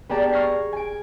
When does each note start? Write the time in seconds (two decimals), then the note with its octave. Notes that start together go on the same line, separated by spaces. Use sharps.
0.09 B3 G4 G#4 D5 A5 A#5
0.32 C#6 F6 G#6 A#6 C7 C#7
0.73 G#5 D7